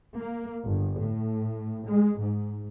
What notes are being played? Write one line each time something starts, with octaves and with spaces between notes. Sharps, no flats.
A#3
G1
A2
G#3
G#2